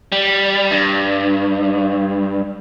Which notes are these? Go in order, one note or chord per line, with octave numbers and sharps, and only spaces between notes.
G3
G2